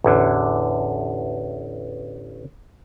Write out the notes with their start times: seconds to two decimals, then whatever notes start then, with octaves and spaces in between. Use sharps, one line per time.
0.04 A1 E2 D3